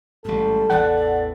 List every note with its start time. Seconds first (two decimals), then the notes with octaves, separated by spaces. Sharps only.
0.25 A1 G#2 G3 A4
0.70 A1 E2 E3 D5 F#5